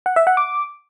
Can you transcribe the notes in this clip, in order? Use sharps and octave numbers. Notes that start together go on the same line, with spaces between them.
F#5
E5
F#5
D6